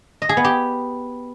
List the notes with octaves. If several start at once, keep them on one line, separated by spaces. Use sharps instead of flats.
D#5
G#4
B3
G4